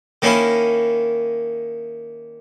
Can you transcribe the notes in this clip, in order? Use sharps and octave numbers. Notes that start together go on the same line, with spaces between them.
D#3 A#3 C#4 E4